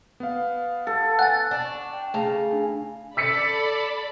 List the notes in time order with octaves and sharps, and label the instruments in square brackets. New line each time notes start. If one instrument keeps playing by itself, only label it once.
[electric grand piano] B3 F5
[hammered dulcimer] A4
[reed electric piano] F#5 G#5 [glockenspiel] F#6 A6
[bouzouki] D4
[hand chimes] C#6
G5
[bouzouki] C#3 A#5 [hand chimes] A3 A5
[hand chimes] D4 G#5
[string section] A4 D5 B5 [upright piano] E6 B6 C#7